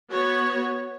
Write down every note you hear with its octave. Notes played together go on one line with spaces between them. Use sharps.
B3 F#4 C#5